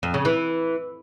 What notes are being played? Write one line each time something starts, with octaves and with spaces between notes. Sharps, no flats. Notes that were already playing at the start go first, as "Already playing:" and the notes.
F2
C#3
E3